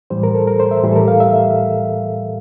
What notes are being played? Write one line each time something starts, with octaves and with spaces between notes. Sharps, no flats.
A2 E3 G3 C5
A#4
A4
A#4
C5
E5
A2 E3 G3 G4
A4
A#4
F5
E5